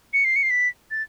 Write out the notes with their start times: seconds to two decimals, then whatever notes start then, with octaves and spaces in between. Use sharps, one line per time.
0.13 C#7
0.25 C7
0.36 C#7
0.43 C7
0.50 B6
0.91 A6